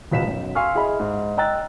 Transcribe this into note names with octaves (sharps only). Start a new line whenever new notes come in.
E1 C#2 B6 E7
B1 F#2
F5 G#5 C6 C#6 E6 F6
E4 G#4 D#5 B5
G#2
D#5 G5 A#5 E6 F#6 A6